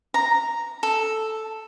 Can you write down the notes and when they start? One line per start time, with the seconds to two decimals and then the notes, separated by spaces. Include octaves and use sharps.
0.14 A#5
0.83 A4